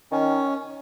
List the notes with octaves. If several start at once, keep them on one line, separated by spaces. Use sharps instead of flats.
D#3 C#4